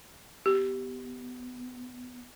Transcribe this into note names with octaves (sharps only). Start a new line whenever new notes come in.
B3 G4